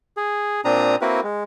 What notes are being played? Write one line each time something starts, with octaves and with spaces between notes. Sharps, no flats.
G#4
A#2 C4 D4 A#5 D#6
A#3 C4 E4 F#4 A#4 B4
G#3